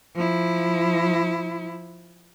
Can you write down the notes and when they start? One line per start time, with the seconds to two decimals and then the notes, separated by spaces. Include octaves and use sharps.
0.15 F3 E4